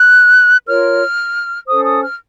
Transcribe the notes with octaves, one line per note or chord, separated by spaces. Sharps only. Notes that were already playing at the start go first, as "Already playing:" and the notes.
Already playing: F#6
F4 A#4 C#5 F6
C#4 A4 C5 D#6
D#6
F6